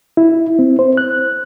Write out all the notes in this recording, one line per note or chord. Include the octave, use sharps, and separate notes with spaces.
E4
C4
C5
F#6